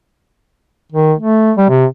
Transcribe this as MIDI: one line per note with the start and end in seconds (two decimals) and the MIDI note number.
0.92 1.13 51
1.19 1.52 57
1.57 1.68 55
1.69 1.85 48